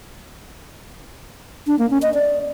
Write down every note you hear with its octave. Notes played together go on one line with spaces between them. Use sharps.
D4
A#3
C#4
D#5
D5